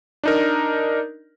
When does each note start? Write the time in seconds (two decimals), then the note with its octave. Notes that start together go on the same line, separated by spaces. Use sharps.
0.24 D4 D#4 A#4